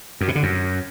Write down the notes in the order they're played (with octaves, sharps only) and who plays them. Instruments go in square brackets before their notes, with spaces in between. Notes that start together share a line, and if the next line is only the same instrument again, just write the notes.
[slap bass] F#2
B2
D3
F#2